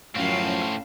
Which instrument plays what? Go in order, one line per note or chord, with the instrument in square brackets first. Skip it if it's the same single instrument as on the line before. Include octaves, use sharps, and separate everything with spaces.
[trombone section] F#2 F3 [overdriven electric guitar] A2 [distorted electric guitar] D3 C4 [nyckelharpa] C#4 F5